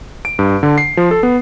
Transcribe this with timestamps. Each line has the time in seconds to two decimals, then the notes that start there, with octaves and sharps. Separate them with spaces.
0.25 D7
0.39 G2
0.63 D3
0.78 C7
0.97 F3
1.11 A4
1.23 B3